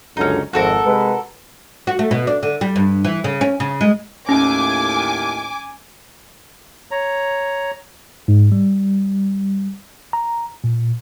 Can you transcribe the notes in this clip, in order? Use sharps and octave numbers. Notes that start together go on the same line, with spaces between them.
C#2 F#2 D3 C#4 D#4
G#1 F2 F#4 A4 A#4
C3 G#3 B4
F#4
A3
B2
D4
D3
G3
G2
E3
C#3
C#4
C#3
G#3
D#2 A2 C#4 G#5 D6
C#5 A#5
G#2
G3
A#5
A#2